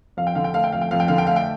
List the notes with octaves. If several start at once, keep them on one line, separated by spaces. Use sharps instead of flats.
F2 F5
G5
D3 F5
G5
A3 F5
G5
F2 F5
G5
F2 F5
G5
D3 F5
G5
A3 F5
G5